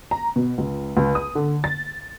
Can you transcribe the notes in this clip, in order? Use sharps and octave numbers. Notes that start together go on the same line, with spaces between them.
A#5
B2
C#2
C#2
D#6
D3
A6